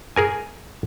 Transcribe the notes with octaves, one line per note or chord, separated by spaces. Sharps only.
G#4 A#4 G#5